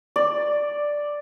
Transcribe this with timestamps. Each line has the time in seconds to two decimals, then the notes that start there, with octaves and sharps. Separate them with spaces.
0.16 D5